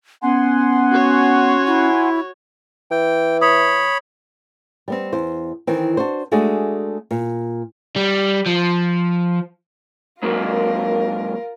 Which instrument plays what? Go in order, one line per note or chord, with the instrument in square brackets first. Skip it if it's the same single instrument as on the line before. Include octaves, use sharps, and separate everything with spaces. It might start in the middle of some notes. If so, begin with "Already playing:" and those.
[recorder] B3 [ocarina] C#4 [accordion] F#5 G#5 C6
[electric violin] F#4 C#5
[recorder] E4
[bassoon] E3 [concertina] G5
[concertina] C#5 B5 [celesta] D#6
[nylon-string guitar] G3 B3 C4
E2 C5
D#3 E3 C4
D4 F#4 C5
G#3 A3 D4 F#4 G#4
A#2
[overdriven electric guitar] G3
F3
[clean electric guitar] G#2 F#3 A#3 [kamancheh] F4 A#4